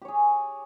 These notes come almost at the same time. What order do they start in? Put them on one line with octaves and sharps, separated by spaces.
G4 C#5 G#4